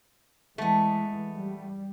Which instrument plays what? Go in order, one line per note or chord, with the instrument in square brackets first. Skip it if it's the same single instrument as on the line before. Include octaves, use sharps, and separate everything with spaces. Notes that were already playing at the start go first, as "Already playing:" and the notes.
[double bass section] E3 G#3 [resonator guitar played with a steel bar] A3 B3
[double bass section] G3